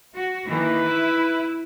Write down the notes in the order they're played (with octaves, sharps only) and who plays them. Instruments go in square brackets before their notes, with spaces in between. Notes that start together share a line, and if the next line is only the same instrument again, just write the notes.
[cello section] F#4
[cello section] D#3 E3 A#3 [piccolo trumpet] B4
[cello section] E4